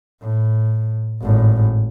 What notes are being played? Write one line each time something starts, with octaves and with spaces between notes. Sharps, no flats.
A2
G#1 A2